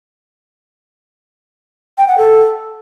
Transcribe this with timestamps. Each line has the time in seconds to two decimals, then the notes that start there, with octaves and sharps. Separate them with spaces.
1.98 G5
2.08 F#5
2.18 A4